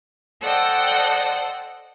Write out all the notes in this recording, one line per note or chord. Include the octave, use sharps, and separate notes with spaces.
A4 C5 D5 D#5 F#5 G5